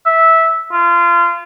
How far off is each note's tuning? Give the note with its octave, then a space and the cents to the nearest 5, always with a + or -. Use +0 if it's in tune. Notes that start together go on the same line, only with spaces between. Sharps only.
E5 -10
F4 -25